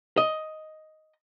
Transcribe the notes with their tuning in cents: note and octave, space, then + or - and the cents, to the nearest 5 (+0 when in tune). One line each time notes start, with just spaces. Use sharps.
D#5 +5